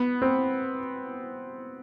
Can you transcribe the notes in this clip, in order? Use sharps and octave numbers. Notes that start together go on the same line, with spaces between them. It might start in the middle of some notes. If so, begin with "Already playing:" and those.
Already playing: B3
C4